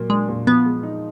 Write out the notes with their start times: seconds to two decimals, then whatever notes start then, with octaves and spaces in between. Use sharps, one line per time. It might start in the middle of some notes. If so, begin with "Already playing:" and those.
Already playing: A#2 F#3 A#3
0.10 G#3 D4
0.29 A#2
0.47 F3 B3
0.66 G#3
0.83 D#4